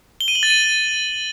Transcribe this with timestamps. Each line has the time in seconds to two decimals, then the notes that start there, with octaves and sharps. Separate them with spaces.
0.21 G7
0.28 D#7
0.35 F#7
0.43 A6
0.50 D#7